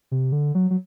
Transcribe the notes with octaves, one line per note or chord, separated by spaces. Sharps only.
C3
D3
F#3
F#3